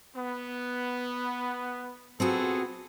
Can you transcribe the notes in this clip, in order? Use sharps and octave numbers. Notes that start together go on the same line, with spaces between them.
B3
B3 C4 F4 F#4 G#4 A4